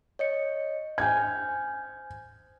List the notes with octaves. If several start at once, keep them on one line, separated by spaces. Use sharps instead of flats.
C#5 D#5 C#7
C5 G#5 F6 G6 G#6